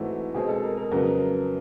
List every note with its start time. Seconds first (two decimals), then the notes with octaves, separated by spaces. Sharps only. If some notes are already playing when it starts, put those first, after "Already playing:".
Already playing: G#2 E3 A3 C4 F#4
0.35 B2 G#3 C4 G#4
0.49 A4
0.63 A#4
0.77 A#4
0.91 F2 C#3 F#3 B3 A#4